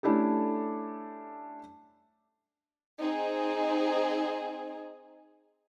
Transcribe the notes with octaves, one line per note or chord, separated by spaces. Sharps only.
A3 C#4 D4 E4 G4 A4
C4 D#4 G#4